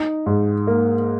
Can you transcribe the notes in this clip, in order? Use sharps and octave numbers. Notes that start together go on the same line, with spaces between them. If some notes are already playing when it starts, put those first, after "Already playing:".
Already playing: D#4
G#2
A#3